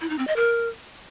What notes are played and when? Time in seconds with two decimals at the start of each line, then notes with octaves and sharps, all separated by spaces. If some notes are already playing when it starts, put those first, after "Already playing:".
0.01 E4
0.10 D#4
0.19 C4
0.27 D#5
0.36 A#4